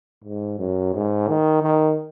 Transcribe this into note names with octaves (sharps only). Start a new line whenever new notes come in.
G#2
F#2
G#2
D#3
D#3